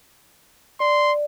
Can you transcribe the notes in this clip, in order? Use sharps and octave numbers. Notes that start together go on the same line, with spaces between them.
D5 C6